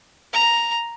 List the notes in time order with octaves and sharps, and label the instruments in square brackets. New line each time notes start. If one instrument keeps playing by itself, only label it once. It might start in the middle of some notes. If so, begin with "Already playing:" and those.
[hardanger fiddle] A#5